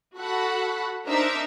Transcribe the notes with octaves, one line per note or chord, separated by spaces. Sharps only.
F#4 A4 F#5 B5
D4 D#4 A#4 C5 E5 A#5